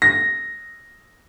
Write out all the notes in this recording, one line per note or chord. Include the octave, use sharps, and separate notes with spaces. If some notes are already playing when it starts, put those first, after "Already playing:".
A#6